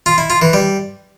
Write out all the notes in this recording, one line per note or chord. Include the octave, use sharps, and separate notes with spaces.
F4
E4
F4
E3
G3